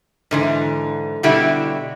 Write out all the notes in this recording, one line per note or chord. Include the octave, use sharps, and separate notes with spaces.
G#2 D3 E3
B2 D3 G3 E4 F#4 G4